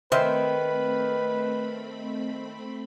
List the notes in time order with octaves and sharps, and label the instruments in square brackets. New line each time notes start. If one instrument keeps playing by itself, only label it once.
[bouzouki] D#3 [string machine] A3 C4 B5 [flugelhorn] B4 [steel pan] C5 E5